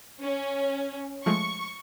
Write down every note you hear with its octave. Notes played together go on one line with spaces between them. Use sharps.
C#4
F3 G#3 A3 C#6